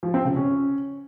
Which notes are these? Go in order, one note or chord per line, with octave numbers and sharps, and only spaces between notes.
F3
C4
C#3
C#4